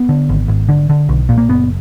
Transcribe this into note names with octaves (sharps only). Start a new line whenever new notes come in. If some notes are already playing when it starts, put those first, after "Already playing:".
Already playing: B3
D3
G#1
G#1
D3
D3
B1
A#2
A#3
F#1 B3